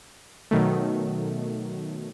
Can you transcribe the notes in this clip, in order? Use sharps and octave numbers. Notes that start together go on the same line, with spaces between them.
B2 D#3 F#3 A3